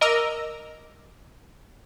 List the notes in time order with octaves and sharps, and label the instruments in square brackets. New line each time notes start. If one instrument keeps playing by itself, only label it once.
[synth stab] A#4 D#5 A#5 D6 E6